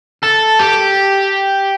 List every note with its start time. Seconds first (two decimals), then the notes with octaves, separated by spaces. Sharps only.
0.23 A4
0.60 G4